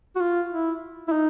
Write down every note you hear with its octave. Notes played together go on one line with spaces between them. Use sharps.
F#4
F4
E4
E4
D#4